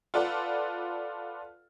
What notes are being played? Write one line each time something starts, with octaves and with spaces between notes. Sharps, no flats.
F4 A4 B4 D5 F#5